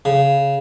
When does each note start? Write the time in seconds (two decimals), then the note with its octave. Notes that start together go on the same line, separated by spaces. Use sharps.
0.05 C#3